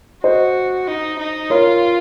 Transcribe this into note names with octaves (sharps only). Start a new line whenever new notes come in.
F#4 C5 D#5
D#4
D#4
F4 A#4 C#5